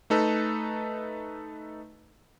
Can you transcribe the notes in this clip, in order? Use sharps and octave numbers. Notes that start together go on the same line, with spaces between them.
A3 D#4 A4 B4